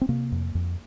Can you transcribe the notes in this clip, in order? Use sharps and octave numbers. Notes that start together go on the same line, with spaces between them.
C4
C3 A#3
F2
F2